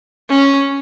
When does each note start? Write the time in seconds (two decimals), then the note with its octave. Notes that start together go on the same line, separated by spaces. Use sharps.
0.29 C#4